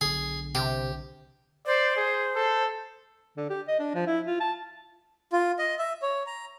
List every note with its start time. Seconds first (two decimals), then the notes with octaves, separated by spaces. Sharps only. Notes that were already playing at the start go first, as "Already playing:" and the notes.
0.01 B1 D3 G#4
0.55 C3 G4
1.66 C5 D5
1.97 G#4
2.36 A4
3.37 D3
3.50 G4
3.68 D#5
3.79 D4
3.95 F3
4.07 E4
4.27 F4
4.40 A5
5.32 F4
5.59 D#5
5.79 E5
6.02 C#5
6.26 A#5